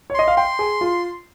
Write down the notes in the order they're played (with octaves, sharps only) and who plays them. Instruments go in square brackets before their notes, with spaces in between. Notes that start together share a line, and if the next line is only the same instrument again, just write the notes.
[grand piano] C#5
[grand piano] D#5 [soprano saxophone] C6
[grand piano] F5
[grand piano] G5 [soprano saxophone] C6
[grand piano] G#4
F4